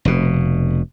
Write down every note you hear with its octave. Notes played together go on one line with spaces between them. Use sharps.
F1 B2